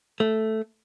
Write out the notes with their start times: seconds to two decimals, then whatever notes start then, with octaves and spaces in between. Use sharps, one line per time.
0.20 A3